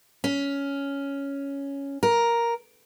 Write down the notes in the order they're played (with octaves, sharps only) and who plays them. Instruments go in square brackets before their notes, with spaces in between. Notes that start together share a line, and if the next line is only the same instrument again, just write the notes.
[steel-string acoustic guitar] C#4
A#4